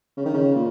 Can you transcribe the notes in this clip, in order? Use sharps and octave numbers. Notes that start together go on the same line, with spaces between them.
C#3
D#3
C#3
A#2